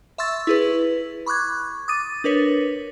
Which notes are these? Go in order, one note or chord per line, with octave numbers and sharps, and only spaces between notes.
E5 C6 C#6 E6 A6
E4 G#4 B4
B5 C#6 D6 F#6 G#6
D6 D#6 A6 D#7
D4 A#4 B4 C#5